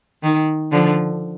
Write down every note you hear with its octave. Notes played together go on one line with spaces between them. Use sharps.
D#3
D3 F3